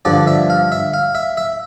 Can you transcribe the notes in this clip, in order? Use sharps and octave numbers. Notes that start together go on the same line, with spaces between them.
G2 D3 F3 D5
E5
F5
E5
F5
E5
E5